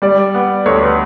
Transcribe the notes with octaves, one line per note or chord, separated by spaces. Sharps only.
G3 D5
B3
D2 C#5
B4